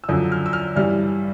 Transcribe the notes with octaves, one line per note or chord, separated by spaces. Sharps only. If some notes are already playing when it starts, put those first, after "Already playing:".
E6
F#2 D3 F3 D#6
F6
E6
F6
G2 E3 G3 F6